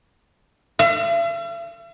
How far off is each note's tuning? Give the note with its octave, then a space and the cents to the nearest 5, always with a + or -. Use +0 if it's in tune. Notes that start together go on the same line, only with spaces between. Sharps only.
E5 +45